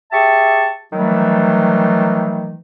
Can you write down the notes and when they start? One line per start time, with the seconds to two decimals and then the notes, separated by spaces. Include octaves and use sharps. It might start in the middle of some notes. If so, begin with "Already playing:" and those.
0.12 G4 G#4 E5 A5 C#6
0.93 D#3 E3 F#3 G3 A3